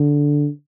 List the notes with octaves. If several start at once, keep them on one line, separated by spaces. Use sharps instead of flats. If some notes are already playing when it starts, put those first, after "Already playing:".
Already playing: D3